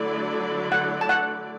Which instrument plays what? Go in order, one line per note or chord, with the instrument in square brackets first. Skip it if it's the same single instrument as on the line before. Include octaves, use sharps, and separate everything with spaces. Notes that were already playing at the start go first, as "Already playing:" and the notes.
Already playing: [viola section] D3 F#3 A3 E4 D5
[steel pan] F#5
A5
F#5